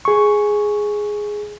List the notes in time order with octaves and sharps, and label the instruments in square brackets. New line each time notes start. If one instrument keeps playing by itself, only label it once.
[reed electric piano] G#4 C#6